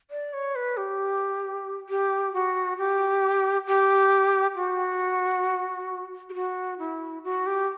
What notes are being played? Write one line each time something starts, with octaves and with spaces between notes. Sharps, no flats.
D5
C#5
B4
G4
G4
F#4
G4
G4
F#4
G4
F#4
E4
F#4
G4